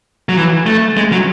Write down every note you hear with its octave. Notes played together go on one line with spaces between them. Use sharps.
F#3
E3
A3
G#3
F#3